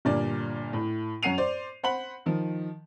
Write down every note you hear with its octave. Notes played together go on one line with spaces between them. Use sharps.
G1 G2 A#2 D5
A2
F#2 C#5 F#5 C7 D#7 F7
C5 D5
C5 F#5 B5 F#7
D#3 F3